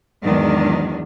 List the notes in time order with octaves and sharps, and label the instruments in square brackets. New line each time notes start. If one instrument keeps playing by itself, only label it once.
[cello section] E2 G#2 D#3 F#3 D4